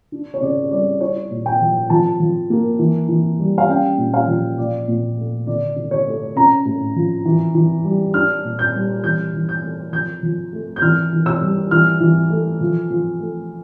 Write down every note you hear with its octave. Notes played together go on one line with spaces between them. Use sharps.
D4
C#5
C#3 D5
C#5
G3 D5
E4 C#5
A#2
G5
F3
F3 A5
F3
A#3
E3
E3
G3
F5
C#4 G5
A#2
F5
F3
A#2 D5
A#2
A3
D3 D5
D3
C#5
A3
C#4 A#5
A2
F3
E3
E3
G3
D4 F6
A#2
G6
G3
E3 G6
E3
G6
A3
F3 G6
F3
A3
G6
E3 F6
E3
E6
G3
E3 F6
E3
A3
F3
F3
A3